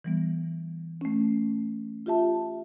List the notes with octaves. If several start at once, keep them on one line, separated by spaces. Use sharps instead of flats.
E3 G3 B3
A3 C#4
F4 G4 E5 A5